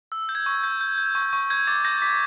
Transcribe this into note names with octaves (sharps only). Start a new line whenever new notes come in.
E6
G6
G#6
C#6
G6
G6
G6
C#6
C#6
G6 G#6
D6 A6
G6 A#6
D6 B6